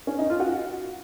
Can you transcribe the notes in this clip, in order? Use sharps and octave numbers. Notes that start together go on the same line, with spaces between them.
C#4
D#4
F4
F#4